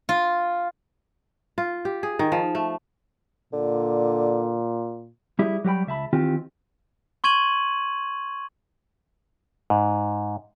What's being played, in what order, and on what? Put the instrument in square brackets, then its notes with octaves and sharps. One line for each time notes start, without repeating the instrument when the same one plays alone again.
[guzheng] F4
[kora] F4
G4
G#4
D#3
F3
A3
[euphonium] A#2 [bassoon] D3
[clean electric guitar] G3 E4 G4 G#4
F#3 G3 B4 G5 B5
C#2 E5 A5 B5
D#3 E3 C4 F4 G4
[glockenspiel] C6 C#6 G#6 D#7 F#7
[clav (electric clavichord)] G#2